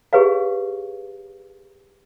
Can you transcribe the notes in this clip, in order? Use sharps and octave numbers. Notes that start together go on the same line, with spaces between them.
G4 G#4 B4 C#5 F5